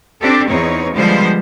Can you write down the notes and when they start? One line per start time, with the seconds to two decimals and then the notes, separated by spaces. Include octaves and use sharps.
0.21 C4 D4 G4 A4
0.50 E2 C4 D#4 C#5
0.96 D3 F3 G3 G#3 B3 C5